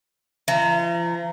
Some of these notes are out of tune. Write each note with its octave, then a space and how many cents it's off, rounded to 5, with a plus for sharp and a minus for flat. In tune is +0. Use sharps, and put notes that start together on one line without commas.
F3 -40 A#5 -15